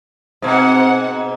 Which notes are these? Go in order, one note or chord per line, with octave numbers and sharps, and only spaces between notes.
G#2 B2 C4 F#5